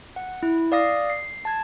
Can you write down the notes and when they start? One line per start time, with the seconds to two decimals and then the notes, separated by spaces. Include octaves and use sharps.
0.16 F#5
0.43 E4
0.72 D5 F5 D#6 A#6 C7
1.10 C7
1.45 A5 G#6